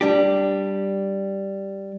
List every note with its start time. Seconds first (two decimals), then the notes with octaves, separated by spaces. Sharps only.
0.01 G3 D4 G4